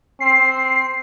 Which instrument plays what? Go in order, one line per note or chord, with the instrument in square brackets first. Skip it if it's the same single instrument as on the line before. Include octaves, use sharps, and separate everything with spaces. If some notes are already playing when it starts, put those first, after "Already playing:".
[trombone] C4 [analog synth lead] C7